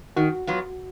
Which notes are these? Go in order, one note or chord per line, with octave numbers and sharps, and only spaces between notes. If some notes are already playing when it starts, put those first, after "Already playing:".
D#3 F#4
F#3 B3 F4